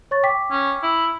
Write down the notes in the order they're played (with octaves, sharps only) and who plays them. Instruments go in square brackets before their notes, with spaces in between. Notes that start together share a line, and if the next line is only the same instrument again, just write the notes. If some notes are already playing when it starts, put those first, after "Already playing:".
[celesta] C#5 C#6 A6
G5 D6 B6
[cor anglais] C#4
E4